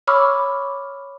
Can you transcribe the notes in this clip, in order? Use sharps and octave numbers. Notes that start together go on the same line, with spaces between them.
C#5 B5 C#6 D6 E6 F6